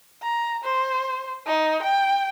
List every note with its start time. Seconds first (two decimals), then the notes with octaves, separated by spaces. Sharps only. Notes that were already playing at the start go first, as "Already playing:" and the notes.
0.22 A#5
0.64 C5
1.46 D#4
1.83 G5